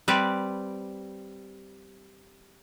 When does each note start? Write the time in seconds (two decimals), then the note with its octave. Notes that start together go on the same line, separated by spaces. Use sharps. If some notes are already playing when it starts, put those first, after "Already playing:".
0.08 G3 C4 B4 D5